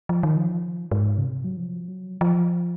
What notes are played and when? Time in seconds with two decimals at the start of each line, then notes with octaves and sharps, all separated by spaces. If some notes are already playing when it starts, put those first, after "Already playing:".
0.09 F3
0.23 D#3
0.37 F3
0.91 G#2
1.18 C#3
1.24 C3
1.44 F#3
1.57 F3
1.88 F#3
2.21 F3